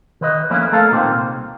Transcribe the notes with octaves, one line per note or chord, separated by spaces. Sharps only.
D#3 B4 D#5
D3 F3 A#3 C#4 E4 B4
A3 A#3 A4 A#4 F5
A#2 D#3 A#3 C4
C2